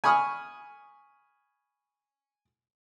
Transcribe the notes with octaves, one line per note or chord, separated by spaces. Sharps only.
G#5 B5 C#6 D#6 F6